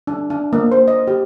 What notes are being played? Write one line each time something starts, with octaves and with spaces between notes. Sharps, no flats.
D4
D4
A#3
C5
D#5
G4